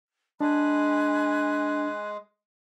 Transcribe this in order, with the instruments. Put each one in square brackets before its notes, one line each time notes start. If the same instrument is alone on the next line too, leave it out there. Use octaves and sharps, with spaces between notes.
[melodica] G#3 [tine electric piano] D4 [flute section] G#5 B5 F#6